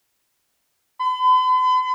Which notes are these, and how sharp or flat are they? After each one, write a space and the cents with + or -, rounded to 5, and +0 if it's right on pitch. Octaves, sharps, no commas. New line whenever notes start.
B5 +45